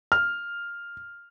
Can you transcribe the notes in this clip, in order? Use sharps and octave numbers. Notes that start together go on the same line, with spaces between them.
F6